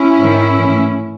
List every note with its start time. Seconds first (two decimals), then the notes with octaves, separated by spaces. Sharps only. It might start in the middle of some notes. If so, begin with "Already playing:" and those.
Already playing: C#4 E4
0.19 G#2 D#3
0.55 A2 E3